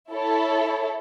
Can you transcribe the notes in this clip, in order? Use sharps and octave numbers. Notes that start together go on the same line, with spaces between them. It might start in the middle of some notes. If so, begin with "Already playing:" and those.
E4 A4 C#5